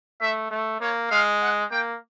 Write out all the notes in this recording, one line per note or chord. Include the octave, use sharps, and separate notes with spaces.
A3 E5
A3
A#3 C#5
G#3 F5
F#5
A#3 G5